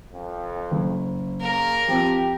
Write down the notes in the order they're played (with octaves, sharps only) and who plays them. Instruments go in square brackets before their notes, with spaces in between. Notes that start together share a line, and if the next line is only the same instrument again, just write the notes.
[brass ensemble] F2
[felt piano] F#1
[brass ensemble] C#3 A#3 [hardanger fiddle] A#4
[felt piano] F3 C4 [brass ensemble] G4